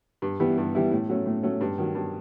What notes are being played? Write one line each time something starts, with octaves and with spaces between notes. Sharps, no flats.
G2
E3 G3 B3 E4
G2
E3 G3 B3 E4
A2
F#3 A3 C#4
A2
F#3 A3 C#4
G2
D#3 F#3
G2